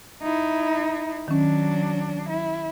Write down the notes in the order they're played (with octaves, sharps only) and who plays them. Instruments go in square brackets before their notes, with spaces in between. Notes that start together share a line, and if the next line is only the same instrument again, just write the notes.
[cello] D#4 E4
[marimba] D#3 C#4 [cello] F#3 D4
[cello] E4